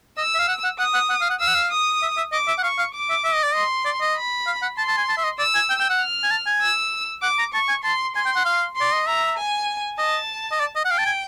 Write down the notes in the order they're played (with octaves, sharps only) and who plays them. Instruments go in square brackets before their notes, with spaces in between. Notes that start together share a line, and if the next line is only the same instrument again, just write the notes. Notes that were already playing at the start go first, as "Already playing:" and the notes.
[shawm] D#5 [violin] E6
[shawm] E5
F5
F#5
F#5
[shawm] F#5 [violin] D#6
[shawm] F#5
F#5
F5
F#5
[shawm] F5 [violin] E6
[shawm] F#5
F5
[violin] D#6
[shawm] E5
E5
[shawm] D#5 [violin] D6
[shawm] E5
F#5
[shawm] F5 [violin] C#6
[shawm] F5
[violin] D6
[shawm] E5
E5
D#5
D5
[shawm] D#5 [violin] C6
[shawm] D5
D#5
[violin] B5
[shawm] F5
F#5
[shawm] A5 [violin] C6
[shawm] A5
G#5
A5
E5
D#5
[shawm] D5 [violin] E6
[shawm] G#5
G5
G5
F#5
[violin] F6
[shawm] G#5
A5
G#5
[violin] E6
[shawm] F#5 [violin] D6
[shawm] A#5
[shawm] A5 [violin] C#6
[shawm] G#5
[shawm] A5 [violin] C6
[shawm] G#5 [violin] C6
[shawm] G5
F#5
F5
[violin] C6
[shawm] D5
D#5
[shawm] E5 [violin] A#5
[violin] G#5
[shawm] D#5 [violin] A5
[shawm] D#5
D5
D#5
F#5
[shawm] F5 [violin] G5
[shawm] A5
G#5